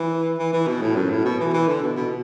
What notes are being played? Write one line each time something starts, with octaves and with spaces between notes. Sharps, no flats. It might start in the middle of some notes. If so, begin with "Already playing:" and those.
Already playing: E3
E3
E3
B2
A2
F#2
A2
B2
E3
E3
D3
B2
B2